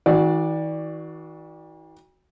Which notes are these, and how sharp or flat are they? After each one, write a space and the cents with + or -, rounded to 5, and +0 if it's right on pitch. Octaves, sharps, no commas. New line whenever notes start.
E3 -45 F#4 +0 D5 +10